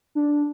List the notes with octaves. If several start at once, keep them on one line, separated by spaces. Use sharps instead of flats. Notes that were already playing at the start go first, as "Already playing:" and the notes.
D4